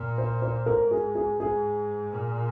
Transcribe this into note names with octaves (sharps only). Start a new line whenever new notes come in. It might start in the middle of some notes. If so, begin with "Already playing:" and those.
Already playing: A#2
C5
C5
G#2 A#4
G#4
G#4
G#2 G#4
A#2